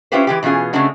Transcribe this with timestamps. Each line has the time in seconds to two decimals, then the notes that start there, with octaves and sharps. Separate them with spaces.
0.12 C#4 E4 F4 G4 B4 C5
0.27 E3 G#3 G4
0.43 B2 E3 C#4 F4 G#4
0.73 C#3 G#3 A3 C4 D4 F#4